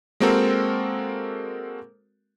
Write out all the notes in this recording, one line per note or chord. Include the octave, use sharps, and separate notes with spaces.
G#3 A#3 C4 F#4 A4 A#4